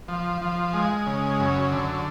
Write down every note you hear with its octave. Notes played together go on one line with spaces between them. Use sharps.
F3
F3
G#3
C#3
F#2
D3